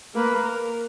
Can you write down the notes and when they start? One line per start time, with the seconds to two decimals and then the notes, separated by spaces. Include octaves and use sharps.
0.16 A#3 B4
0.45 A#4